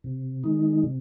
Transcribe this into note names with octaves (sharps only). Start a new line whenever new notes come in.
C3
D#3 G#3 D#4
C3